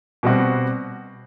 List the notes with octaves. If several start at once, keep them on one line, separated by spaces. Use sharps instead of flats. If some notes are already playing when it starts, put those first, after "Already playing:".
B2 G3 C4 F#4